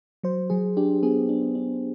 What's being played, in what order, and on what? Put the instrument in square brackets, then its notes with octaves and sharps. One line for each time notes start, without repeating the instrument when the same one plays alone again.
[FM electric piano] F#3 C5
F#3 G#4
D4 G4
B3 G#4
D4
D4